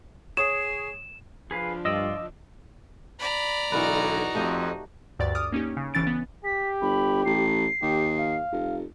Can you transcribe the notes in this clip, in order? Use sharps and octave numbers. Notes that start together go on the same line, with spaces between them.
G#4 C#5 D#6 E7
F3 D4 G#4 B4 F5
G2 F4 D5 D#5 E6
D5 A#5 B5
B1 D3 E3 D#4 F#4 A#4 B4
F2 A3 G4 D#5
D2 G2 G4 D5 A6
D6 D#6 F6
A#3 C#4 D#4 G4
C#3
G1 C#3 E3 C#4 A6 D7
B3
G4 B6
G1 B5
A1 C7
D#2 G4
F5
F1